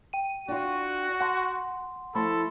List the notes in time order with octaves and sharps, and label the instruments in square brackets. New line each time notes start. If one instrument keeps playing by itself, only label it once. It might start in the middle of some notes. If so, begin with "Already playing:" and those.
[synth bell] G5 D#7
[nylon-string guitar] D4 F4 [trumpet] F#4
[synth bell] F#5 C6 [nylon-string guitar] A5
[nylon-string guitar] F3 A3 E4 [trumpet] A4 [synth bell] B5 C6